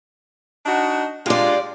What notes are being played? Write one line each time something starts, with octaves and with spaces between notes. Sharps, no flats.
D4 D#4 F#4
G#3 D4 F4 G4 D5